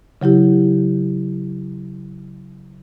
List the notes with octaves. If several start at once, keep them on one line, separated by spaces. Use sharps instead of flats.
C#3 F#3 E4 G4